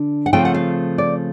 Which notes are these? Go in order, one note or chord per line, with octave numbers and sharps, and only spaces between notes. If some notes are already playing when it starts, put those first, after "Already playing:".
Already playing: D3 D4
F#5
C#3 F3 A3 C4 F4 G5
F#5
F5
D5